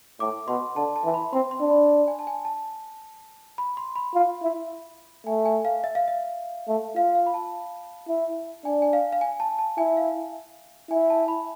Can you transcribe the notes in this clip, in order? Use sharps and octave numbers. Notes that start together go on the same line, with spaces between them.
A2 D6
B2 C6
D3 A5
A5
E3
B5
C4 C6
C6
D4
B5
G#5
A5
G#5
A5
B5
C6
B5
F4
E4
A3 G#5
G#5
F5
E5
F5
E5
A3
F4 F5
F5
B5
A5
E4
D4 G#5
G#5
F5
F5
G#5
A5
A5
E4 G#5
F5
E4 G#5
A5
B5